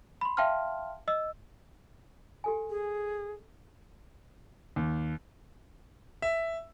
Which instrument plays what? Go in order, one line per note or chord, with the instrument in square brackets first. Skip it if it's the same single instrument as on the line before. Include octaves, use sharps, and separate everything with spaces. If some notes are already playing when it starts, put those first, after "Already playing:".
[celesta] B5 C6
E5 F5 G5 A5 C6 F6
D#5 E6
[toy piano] G4 A4 G#5
[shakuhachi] G#4
[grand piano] D#2
E5